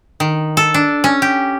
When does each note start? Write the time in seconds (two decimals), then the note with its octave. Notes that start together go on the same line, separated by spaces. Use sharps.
0.20 D#3
0.57 A4
0.74 D4
1.04 C#4
1.22 G4